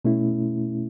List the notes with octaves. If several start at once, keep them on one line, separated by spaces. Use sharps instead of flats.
B2 A3 C#4 E4